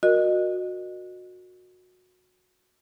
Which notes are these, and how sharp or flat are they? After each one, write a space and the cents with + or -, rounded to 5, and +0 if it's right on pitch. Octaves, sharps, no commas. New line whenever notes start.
F#4 -20 A#4 +0 D#5 -25